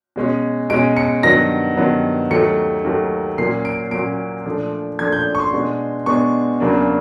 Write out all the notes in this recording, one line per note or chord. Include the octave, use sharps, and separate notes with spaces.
B2 G#3 C#4
B2 G#3 C#4 D7
C#7
G2 D#3 F#3 B3 A#6
G2 D#3 F#3 B3
D#2 D#3 F#3 A3 C#7
D#2 D#3 F#3 A3
A#2 F#3 A#3 C#4 C7
D7
A#2 F#3 A#3 C#4 D7
A#2 F3 A3 D4
A#2 F3 A3 D4 G#6
G6
C#6
C6
B2 G#3 B3 D4
B2 G#3 B3 D4 C#6
E2 C#3 F#3 A#3 D4